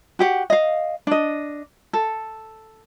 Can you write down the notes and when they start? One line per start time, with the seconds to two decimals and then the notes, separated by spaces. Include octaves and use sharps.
0.19 F#4 G4 F#5
0.50 D#5 F5
1.07 D4 D#5
1.93 A4